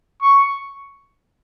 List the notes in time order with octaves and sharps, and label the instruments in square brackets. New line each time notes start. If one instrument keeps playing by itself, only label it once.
[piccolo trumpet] C#6